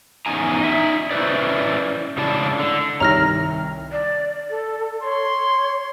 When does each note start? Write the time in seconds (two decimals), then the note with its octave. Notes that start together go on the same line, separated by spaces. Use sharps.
0.26 E2 C#4 D#4 G#5 A#5
0.60 D#4 E5
1.11 C#4 E4 B4 C5 D5
2.17 C#3 G#3 E4 D5 A5
2.59 D3
3.00 C2 D#3 C#5 A#5 F6 A#6
3.92 D5
4.50 A4
5.03 C#5 C6